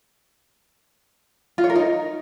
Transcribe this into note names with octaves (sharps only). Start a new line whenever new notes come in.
F4
C#5
A#4
D#4